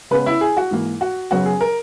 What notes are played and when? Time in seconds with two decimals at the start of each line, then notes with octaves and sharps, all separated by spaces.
0.11 C#3 G#3 B3 B4
0.26 E4
0.41 G#4
0.57 F#4
0.71 G#2 E3 A#3
1.01 F#4
1.31 F#2 C#3 F#3 B3 F#4
1.46 G#4
1.61 A#4